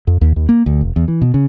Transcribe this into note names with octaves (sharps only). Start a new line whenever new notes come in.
F2
D#2
D#2
A#3
D2
F1
E2
E3
B2
C#3